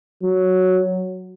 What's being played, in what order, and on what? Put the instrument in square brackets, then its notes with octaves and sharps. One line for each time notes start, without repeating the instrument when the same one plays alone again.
[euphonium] F#3